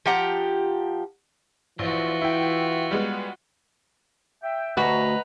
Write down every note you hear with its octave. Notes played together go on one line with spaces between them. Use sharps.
F3 G4 F#5 A#5
A#1 E3 F4 F#4
E4 G5
G3 G#3 B3
E5 G5
D2 F#4 B4 D#5 F#5 A#5